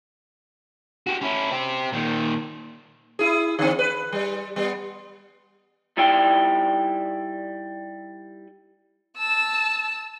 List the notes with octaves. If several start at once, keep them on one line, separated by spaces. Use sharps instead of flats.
F#4 G4
C#4 E4
C4 G4
A#2 D#3
E4 G#4
D3 C4
B4
G3
G3 B3
G3 D#4 E4 D5 G5
A5 E6